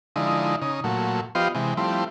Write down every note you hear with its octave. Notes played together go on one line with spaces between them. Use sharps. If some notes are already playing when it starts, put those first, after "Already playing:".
D3 F3 G#3 D#4 E4
C#3 D#4
A#2 F#3 A3
F3 B3 F4 G4 C5 D#5
C3 E3 G#3
F3 G3 A3 C4 E4